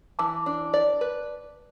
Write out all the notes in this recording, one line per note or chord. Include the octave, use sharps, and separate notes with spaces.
E3 A5 D6
D4
D5
B4